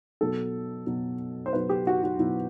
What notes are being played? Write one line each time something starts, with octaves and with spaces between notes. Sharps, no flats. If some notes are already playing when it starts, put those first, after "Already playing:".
B2 F#3 A4
B2 F#3
C5
B2 F#3 B4
G4
F#4
F#4
B2 F#3 E4